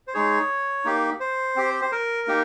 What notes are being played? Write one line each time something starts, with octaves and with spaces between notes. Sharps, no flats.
C5
G#3 D#4 G#4 C#5
A#3 D#4 G4
C5
C4 G4
C5
A#4
A#3 D#4 G4